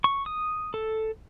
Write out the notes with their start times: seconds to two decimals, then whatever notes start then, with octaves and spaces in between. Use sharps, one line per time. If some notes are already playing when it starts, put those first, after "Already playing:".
0.04 C#6
0.26 D#6
0.74 A4